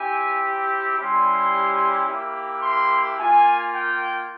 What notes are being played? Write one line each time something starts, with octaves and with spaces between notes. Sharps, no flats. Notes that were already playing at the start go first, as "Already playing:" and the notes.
Already playing: C4 E4 G4 G#5
G3 C#4 E4 G4 C6
A#3 E4 G4
C6
A#3 F4 G#5
G5